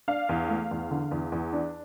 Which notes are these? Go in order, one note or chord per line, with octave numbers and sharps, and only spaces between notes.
D4 F5
E2
A3
E2
D3
E2
E2
D4